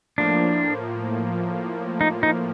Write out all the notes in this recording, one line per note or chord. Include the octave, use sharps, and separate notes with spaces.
A2 F3 A#3 D4
D#4
D#4